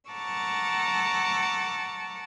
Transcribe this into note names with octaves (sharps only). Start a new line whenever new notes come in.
F#5 A5 A#5 C#6 D6 E6